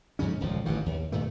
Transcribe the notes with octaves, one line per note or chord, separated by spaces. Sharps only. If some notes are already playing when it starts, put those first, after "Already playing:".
F2 G#2 C#3 C#4
D#1 C#2 A#2 F3
A1 G2 D#3
D#2
G2 A#2 D#3 A3